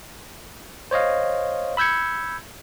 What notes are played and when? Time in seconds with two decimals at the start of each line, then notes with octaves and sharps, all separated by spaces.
0.91 C5 C#5 D#5 F5
1.77 B5 E6 G6 G#6 C#7